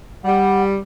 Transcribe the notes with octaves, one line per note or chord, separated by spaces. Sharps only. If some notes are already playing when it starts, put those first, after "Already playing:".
G3 F#5